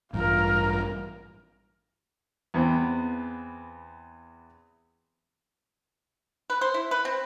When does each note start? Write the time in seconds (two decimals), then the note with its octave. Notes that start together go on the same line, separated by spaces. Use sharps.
0.13 A1 G2 F4 A#4
2.54 E2 B3 C4
6.50 B4
6.61 C5
6.74 E4
6.91 B4
7.05 C4